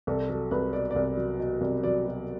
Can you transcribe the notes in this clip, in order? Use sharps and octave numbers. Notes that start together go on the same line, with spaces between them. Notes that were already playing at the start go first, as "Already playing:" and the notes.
C2 A4
F#3 A4
C2 B4
B2 D5
D5
C2
F#3
B2
C2
F#3 D5
B2